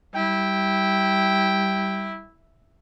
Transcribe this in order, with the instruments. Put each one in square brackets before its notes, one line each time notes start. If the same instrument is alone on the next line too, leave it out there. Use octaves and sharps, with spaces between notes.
[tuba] G3 [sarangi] E4 [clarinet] G5